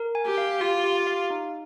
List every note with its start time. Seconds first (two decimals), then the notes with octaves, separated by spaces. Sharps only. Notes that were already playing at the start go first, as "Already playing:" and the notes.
Already playing: A#4
0.15 G#5
0.26 G4
0.38 F5
0.61 F4 G4
0.84 G4
1.07 F5
1.30 D#4